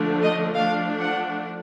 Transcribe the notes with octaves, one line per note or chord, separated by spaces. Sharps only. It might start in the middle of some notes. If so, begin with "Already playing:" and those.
Already playing: D3 F3 A3 D4
D#5
F3 A3 D4 F5
F#5